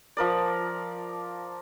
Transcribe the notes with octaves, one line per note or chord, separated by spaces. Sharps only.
F3 A#4 D5